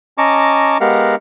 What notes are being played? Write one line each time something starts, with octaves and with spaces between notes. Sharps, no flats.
C#4 D#5 A5 A#5 C#6 D6
G#3 B3 G4 A#4 F5 F#5